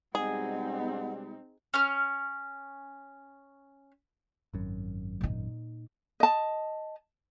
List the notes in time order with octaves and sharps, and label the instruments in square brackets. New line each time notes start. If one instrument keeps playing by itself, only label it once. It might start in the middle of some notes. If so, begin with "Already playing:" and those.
[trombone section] B2 G3 G#3 [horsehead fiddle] C4 D#4 [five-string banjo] G#4 [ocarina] F#5
[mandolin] C#4 F6
[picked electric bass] G#1 F#2
[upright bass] A#2 D#4
[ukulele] D#5 A5